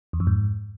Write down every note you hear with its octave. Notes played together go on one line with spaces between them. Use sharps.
E2
F2
G#2